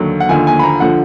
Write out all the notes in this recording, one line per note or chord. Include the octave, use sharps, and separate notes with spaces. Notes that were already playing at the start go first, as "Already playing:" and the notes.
Already playing: D#2 D3 F#3
F#5
D#2 D3 F3 G#5
G#5
B5
A#5
D3 F3 F#5